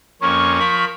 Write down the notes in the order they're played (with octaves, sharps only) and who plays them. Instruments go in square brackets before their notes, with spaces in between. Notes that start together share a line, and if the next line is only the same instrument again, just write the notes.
[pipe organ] F2 A#3 C#4 [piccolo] C#6
[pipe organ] F3 A#4 B5